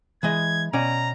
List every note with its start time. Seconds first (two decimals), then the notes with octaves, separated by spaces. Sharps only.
0.23 E3 G#3 D#5 G#6
0.73 B2 C#4 D5 A#5